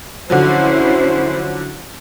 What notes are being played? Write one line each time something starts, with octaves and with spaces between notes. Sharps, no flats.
D3 F3 F#3 C#4 E4 C5